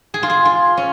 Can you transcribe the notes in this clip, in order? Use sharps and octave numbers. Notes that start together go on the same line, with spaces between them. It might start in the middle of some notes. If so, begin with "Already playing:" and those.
G#4
F4
G#4
F4
C#4